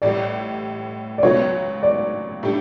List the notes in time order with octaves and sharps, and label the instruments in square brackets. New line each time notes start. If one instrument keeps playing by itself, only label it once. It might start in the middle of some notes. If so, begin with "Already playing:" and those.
[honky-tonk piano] A1 A2 G3 [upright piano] D5
[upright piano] D5
[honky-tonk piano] C#2 C#3 F#3 B3 [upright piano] C#5
[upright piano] D5
[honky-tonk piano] A2 G3 D4 G4